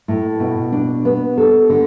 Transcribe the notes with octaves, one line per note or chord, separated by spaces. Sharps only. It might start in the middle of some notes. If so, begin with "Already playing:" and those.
A2
B2
D4
B3
A4
D3